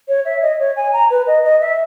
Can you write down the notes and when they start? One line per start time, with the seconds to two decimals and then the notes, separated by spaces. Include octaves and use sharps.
0.08 C#5
0.25 E5
0.42 D#5
0.59 C#5
0.76 G#5
0.93 A#5
1.11 B4
1.27 D#5
1.44 D#5
1.61 E5